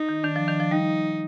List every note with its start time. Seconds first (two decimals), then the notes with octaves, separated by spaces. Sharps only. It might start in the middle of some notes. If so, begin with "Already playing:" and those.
Already playing: D#4
0.09 D#3
0.24 D#3 D4
0.36 F3
0.48 D#3
0.60 F3
0.71 G3 D#4